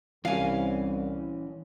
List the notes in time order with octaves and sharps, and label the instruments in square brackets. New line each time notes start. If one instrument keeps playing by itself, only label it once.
[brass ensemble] C2 [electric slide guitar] E3 C#4 [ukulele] F5 G#5